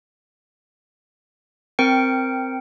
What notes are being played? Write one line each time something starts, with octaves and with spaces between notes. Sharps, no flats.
C4 A#4 G5 C#7